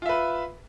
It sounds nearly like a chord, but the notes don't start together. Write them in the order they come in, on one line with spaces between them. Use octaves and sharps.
F4 E5 B4